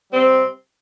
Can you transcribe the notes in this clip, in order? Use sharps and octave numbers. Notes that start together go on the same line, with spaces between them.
C3 G3 C4